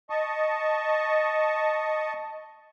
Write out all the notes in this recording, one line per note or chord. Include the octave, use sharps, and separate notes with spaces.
D#5 A5 C#6